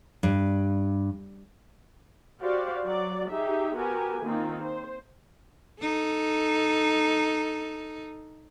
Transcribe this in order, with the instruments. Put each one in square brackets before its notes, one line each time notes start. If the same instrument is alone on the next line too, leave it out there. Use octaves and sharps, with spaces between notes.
[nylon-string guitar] G2
[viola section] F#4 G4 C5 D5 F5
F#3 F#4 D5
D#4 G4 G#4 E5
B3 F#4 G4 A#4 G#5
D#3 A#3 C4 D#4 F4
C5
[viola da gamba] D#4 A4